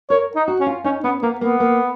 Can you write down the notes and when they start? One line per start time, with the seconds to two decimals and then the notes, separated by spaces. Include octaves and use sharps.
0.10 A#4 C#5
0.36 D#4
0.48 F#4
0.60 C#4
0.67 F4
0.84 C#4 D#4
1.04 B3 C#4
1.22 A#3 B3
1.41 A#3 B3
1.60 A#3